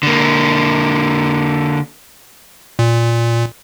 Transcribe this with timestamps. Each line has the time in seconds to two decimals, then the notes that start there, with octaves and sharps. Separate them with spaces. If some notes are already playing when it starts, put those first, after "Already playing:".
0.03 D3 A#3
2.79 A#2